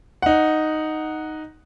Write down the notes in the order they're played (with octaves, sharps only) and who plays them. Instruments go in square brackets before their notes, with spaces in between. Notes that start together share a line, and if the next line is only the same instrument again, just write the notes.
[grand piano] D#4 F#5